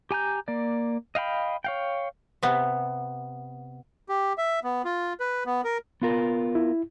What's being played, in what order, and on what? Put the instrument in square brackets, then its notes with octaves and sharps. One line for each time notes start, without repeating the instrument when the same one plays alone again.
[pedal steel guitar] G4 G#5 A#5 G6
A#3 D5
D#5 F5 G5 B5
C#5 F5 G5
[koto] C3 B3
[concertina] G4
E5
B3
F4
B4
B3
A#4
[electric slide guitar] B3 F4 A#4
[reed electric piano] E4